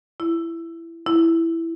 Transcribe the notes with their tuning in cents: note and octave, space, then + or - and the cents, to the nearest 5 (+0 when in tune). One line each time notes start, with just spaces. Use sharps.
E4 +15
E4 +5